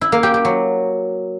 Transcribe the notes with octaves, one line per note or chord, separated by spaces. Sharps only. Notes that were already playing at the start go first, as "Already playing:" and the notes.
E4
A#3
G4
G4
F#3